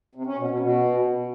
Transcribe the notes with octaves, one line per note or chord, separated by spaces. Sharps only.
C3
C#4
B2
B2
B2